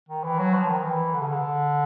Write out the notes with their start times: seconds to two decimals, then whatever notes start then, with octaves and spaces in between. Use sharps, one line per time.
0.09 D#3
0.24 E3
0.39 F#3
0.54 F3
0.69 D#3
0.84 E3
1.15 D3
1.22 C#3
1.29 D3